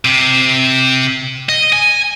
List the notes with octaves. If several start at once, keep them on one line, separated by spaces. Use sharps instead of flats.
C3
D#5
G#5